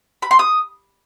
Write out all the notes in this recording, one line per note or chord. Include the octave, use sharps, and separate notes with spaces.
B5
C6
D#6